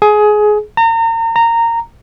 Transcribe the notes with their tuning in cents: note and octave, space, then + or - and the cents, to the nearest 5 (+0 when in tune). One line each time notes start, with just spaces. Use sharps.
G#4 +20
A#5 -35
A#5 -15